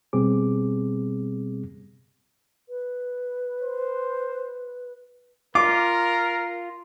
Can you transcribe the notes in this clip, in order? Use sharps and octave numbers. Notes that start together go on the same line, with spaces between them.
B2 G3 B3 C4 G#4 D6
B4
C5
F4 A#4 D6